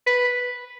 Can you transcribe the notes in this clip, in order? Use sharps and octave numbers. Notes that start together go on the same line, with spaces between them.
B4